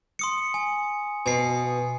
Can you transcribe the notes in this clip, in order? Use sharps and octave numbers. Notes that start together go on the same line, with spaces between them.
C6 D#6 C#7
G#5
B2 G#5 C7